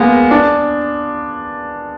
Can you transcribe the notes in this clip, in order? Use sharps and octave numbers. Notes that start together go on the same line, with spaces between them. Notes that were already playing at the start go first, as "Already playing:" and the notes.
Already playing: G#3 A#3 B3
D4